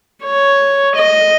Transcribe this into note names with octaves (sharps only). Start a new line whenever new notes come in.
C#5
D#5